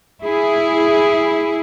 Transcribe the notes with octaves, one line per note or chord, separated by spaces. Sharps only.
E4 G#4